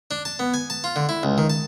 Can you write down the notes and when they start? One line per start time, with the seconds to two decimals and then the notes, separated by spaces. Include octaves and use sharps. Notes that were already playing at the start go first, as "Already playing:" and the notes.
0.11 D4
0.25 A5
0.39 B3
0.54 G#5
0.70 A5
0.84 F4
0.96 D3
1.09 E4
1.23 C#2
1.38 D#3
1.50 A5